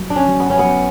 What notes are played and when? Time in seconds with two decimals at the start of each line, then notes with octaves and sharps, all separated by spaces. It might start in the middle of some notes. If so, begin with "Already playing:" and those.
Already playing: F#3
0.10 D4
0.16 C#4
0.28 F#3
0.40 B3
0.50 C#4
0.59 B3
0.65 F#3